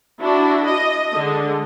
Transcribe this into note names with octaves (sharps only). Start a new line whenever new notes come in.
D4 E4 F#4
D#5
D3 G#3